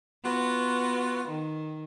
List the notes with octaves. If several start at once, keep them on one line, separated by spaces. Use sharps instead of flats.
B3 F4 F#4
D#3